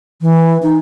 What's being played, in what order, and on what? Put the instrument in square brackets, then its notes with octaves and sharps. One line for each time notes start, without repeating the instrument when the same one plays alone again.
[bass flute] E3
D#4